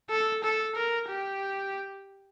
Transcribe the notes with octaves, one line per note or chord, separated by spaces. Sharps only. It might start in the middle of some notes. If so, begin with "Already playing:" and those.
A4
A4
A#4
G4